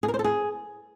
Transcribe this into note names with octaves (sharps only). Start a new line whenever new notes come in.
G#4
A#4
C5
A4
G#4